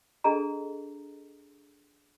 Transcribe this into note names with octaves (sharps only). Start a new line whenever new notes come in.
D4 G#4 A4 D#5 A#5